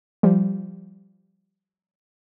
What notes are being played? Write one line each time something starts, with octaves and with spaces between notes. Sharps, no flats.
F3 G3